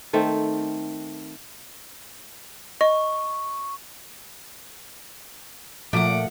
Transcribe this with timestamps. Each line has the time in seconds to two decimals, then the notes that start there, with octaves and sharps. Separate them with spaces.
0.13 D#3 A3 C4
2.81 D#5 C#6
5.93 A#2 F3 A3 F#5 D6